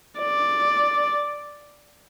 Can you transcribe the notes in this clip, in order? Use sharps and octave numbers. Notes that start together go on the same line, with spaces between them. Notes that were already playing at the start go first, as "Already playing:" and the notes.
D5